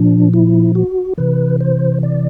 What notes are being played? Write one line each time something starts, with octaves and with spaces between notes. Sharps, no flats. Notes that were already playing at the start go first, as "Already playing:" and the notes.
Already playing: A#2 F3 D4
E4
F#4
C3 E3 B4
C5
D5